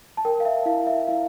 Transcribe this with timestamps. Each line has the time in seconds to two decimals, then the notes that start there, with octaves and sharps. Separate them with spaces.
0.17 A5
0.25 A#4 G5
0.40 F5
0.45 E5
0.66 E4 F5
0.87 E5
1.07 E4 F5